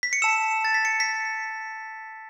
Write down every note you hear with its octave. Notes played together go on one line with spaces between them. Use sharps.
B6
C#7
A5 E6 E7
A6
B6
C#7
B6